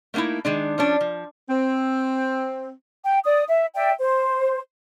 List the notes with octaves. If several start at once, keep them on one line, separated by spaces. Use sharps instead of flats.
A3 A#3 C#4 D#4 E4
D#3 G#3 D4
F3 C#4 D4
F3
C4
G5
D5 D#6
E5
D5 E5 G5
C5